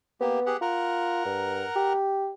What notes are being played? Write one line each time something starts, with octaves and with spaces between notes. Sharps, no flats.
A#3 B3 G4
G4 G#4 F#5
F4 A#4 F#5 A#5
G2
G4